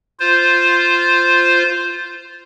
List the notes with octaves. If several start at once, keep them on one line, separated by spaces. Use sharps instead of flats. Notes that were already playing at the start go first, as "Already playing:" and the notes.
F4 C5